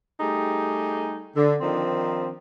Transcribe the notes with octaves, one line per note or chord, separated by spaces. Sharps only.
G3 A3 D#4 G4 G#4
D3
D#3 F3 C4 D4 D#4